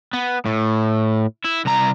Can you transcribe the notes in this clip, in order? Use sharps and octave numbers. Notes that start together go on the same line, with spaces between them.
B3
A2
E4
C2 A#5